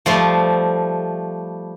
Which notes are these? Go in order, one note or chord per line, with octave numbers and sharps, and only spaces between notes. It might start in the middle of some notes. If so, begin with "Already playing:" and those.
F3 G3 A3 C6